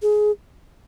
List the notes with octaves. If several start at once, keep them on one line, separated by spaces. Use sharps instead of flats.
G#4